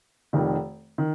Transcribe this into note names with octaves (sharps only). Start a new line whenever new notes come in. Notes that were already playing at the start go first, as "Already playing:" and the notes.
F1 F2 D#3
D#3